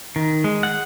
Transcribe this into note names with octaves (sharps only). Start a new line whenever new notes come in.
D#3
G#3
F#5